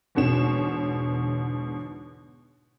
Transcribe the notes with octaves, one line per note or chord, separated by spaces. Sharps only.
E2 G#2 B2 D3 C#5 E7